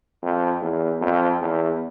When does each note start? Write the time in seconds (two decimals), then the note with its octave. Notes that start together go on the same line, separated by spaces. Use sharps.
0.22 F2
0.62 E2
1.01 F2
1.42 E2